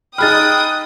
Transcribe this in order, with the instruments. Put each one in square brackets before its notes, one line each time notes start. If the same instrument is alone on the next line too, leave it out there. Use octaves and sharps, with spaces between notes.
[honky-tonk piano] D#4 G#4 B5 [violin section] G5 D#6 [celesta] F6 A6 [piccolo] F#6